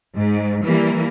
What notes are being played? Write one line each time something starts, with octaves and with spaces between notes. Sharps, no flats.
G#2
E3 G3 A#3